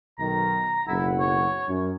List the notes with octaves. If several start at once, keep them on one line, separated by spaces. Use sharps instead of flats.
B1 D#3 A#5
F#1 B1 E4 F#5
C#5
F#2